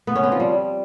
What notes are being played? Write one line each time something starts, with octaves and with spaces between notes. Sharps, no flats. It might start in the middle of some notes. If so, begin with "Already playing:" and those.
B3
C#4
C4
F3
G3